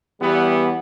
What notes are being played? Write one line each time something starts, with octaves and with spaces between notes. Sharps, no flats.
E2 E3 G3 B3 G4